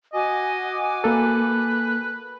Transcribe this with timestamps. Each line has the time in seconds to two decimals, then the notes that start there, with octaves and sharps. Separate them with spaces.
0.13 F#4 D#5 G#5 D6
1.04 A#3 A4 B4